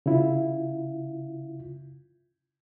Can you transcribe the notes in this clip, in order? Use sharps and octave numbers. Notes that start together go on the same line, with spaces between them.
C#3 E4 F4